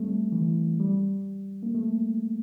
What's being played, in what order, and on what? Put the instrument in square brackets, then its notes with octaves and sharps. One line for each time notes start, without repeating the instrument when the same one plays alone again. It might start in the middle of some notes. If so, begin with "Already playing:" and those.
Already playing: [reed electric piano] G3 A3 C4
E3
G3
A#3
A3